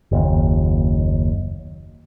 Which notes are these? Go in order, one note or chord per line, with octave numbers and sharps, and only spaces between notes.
F#1 D#2